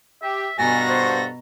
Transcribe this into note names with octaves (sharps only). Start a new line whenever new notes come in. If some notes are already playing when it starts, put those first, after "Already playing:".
G4 E5
G2 B2 F#4 A4 G#5 A#5 A#6
A4 C5